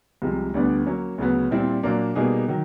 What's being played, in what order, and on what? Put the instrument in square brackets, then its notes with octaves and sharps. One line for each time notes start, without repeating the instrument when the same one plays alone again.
[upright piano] C2 C3 F3 G#3
D2 D3 G3 B3 D4
F#3 A#3 C#4
D2 C#3 F#3 B3
A#2 G3 C4 E4
A#2 F#3 A#3 D4
B2 G3 A#3 D#4 G#4
D#3 F#3